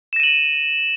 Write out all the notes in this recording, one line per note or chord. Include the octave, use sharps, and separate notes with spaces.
A#6 D#7 E7 F#7